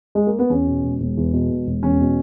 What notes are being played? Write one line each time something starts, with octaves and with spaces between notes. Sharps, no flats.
G#3
A#3
B3
E2 C#4
B2
E1
E1
E2
B2
E1
E1
E2 C#4
B2